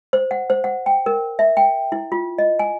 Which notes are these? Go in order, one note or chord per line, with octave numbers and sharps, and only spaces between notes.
C5
F#5
C5
F#5
G5
A#4
E5
G5
E4
F4
D#5
G#5